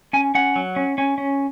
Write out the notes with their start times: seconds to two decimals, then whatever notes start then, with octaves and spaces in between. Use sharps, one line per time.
0.13 C#4 G#5
0.35 C#4 F#5
0.56 F#3
0.76 C#4
0.98 C#4
1.18 C#4